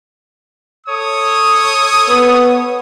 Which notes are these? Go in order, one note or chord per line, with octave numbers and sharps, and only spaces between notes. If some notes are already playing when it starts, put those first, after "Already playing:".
A4 C#5 D#6
B3